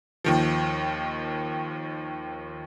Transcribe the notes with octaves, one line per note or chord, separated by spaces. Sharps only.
D#2 D#3 F3